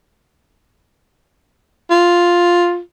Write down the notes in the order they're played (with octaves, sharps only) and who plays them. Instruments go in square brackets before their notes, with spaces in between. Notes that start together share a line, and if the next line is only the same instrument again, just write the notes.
[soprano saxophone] F4